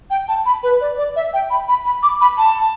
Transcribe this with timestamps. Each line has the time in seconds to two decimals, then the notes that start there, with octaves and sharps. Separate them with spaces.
0.10 G5
0.28 A5
0.46 B5
0.63 B4
0.81 D5
0.98 D5
1.16 E5
1.33 G5
1.50 B5
1.69 B5
1.86 B5
2.03 D6
2.21 B5
2.38 A5